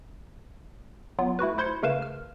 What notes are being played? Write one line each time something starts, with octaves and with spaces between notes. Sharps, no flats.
F#3 B3 F4
A3 E4 F#4 B4
E4 C5 C6 F#6 G#6 C#7
C#3 A3 A#4 B4 F5 E7
F6